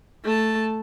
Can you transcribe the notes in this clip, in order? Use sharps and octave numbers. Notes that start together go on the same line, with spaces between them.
A3 A5